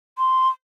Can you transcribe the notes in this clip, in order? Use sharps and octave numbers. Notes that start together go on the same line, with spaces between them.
C6